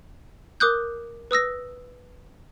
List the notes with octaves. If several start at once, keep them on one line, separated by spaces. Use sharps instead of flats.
A#4 D6 D#6 F#6 G6
B4 D#6 E6 A#6